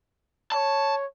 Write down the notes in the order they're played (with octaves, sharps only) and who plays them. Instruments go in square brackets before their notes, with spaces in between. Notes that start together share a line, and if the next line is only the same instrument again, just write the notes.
[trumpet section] C#5 [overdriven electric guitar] A5